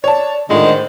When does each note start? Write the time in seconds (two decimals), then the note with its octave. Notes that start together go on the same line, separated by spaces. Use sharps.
0.04 C#5 D5 A5
0.50 A2 D3 D#3 G#3 F4
0.63 C5